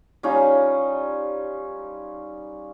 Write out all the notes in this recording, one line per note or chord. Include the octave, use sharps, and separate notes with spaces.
G3 C#4 D#4 F4